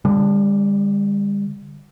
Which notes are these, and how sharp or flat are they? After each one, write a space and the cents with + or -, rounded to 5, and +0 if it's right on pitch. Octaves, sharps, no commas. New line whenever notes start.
D3 +0 G3 +40